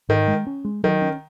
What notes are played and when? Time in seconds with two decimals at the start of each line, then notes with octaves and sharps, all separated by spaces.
0.09 G#2 D#3
0.28 G#3
0.47 C#4
0.65 G#3
0.84 D#3 F#3
1.02 C#4